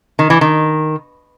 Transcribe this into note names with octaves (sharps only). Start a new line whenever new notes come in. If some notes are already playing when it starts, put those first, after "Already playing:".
D#3
E3
D#3